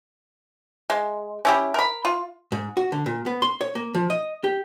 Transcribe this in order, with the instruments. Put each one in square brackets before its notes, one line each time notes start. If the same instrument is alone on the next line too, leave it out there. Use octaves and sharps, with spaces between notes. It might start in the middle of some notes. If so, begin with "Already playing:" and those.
[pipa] G#3
C#4 E4 G4
A#4 B5
F4
[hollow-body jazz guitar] G#2
F#4
D3
A#2
B3
C6
C#5
A#3
F3
D#5
G4